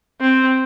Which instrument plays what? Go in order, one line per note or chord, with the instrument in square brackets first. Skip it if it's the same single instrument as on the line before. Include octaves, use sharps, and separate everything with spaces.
[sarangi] C4